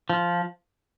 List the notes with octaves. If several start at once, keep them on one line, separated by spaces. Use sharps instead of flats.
F3